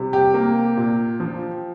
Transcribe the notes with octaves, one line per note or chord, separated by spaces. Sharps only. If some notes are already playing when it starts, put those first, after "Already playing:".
Already playing: C3 G3
G4
A#3
A#2
F3